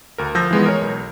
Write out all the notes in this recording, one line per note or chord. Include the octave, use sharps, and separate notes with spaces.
D2 A#4
F3 E6 G6 A#6
E3 G#3 B3
A#4 C#5
B1